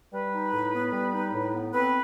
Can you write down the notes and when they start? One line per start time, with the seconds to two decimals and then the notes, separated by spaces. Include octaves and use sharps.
0.12 G3 B4
0.33 D#4
0.53 A2
0.73 B3
0.92 G3
1.13 D#4
1.33 A2
1.52 B3
1.72 C4 B4